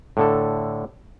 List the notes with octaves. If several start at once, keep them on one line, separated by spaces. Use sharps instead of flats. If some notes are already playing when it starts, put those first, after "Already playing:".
A2 D3 A4